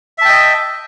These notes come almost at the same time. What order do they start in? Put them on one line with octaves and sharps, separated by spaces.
E5 A5 G5 D#5